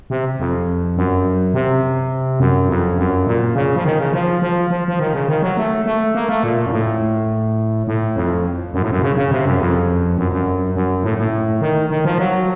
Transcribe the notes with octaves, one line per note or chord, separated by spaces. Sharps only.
C3
F2
F#2
C3
F#2
F2
F#2
A#2
C#3
F3
D#3
C#3
F3
F3
F3
F3
D#3
C#3
D#3
F#3
A3
A3
A#3
A3
A#2
F#2
A2
A2
F2
F#2
A2
F#2
C#3
C#3
C3
F#2
F2
F#2
F#2
F#2
A2
A2
D#3
D#3
F3
F#3